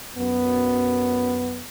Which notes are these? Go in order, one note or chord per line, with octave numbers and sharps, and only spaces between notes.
F#2 B3